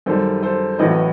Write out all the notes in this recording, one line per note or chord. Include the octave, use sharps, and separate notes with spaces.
F#2 D#3 G3 A4 C5
A4 C5
A1 A2 F#3 B4 D#5